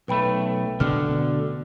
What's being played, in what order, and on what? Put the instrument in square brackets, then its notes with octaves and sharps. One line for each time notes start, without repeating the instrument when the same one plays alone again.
[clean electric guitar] B1 A3 [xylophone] B4 G5 B5
[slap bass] B2 A3 [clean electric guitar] D3 [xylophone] F6